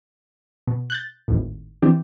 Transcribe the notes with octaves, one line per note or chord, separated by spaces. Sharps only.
B2
F#6 G6 A6
G#1 D#2 A2
E3 C4 D4 G4